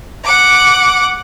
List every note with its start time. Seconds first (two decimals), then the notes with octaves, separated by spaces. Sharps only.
0.24 F#5 D6